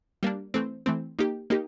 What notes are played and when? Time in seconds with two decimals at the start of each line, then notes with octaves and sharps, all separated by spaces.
0.23 G3 A#3 D4
0.54 E3 A3 C4
0.86 E3 A3 C4
1.19 A#3 D#4 G4
1.50 A#3 D#4 G4